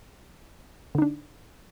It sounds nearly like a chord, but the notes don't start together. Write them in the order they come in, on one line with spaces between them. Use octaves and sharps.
D3 D#4 D4